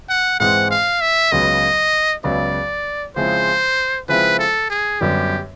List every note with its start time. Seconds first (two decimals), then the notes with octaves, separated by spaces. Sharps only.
0.09 F#5
0.40 G#2 E3 G#3 C4 F#5
0.70 F5
1.01 E5
1.32 C#2 C#3 F#3 B3 D#5
2.24 C#2 C#3 F#3 B3 D5
3.16 C#3 F3 G#3 C4 E4 C5
4.08 C#3 F3 G#3 C4 E4 B4
4.39 A4
4.70 G#4
5.01 F#2 D3 G3 B3 G4